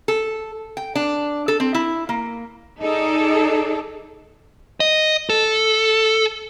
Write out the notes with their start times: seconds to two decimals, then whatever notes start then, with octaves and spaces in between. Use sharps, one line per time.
0.08 A4
0.77 G5
0.95 D4
1.48 A4
1.60 C4
1.74 E4
2.09 A#3
2.82 D#4 G#4 A4 D5
4.80 D#5
5.30 A4